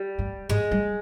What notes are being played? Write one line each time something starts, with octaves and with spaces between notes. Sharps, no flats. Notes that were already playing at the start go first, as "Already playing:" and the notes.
Already playing: G3
G2
G#2 G#3
G3